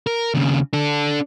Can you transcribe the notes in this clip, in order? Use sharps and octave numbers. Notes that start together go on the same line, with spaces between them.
A#4
D#2 C#3
D4 A4